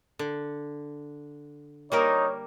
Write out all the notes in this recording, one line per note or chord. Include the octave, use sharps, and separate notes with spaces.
D3
G3 A#3 D#4 A#4 C#5